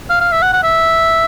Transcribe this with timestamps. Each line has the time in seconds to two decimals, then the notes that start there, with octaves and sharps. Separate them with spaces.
0.10 F5
0.21 F5
0.32 E5
0.42 F#5
0.53 F#5
0.63 E5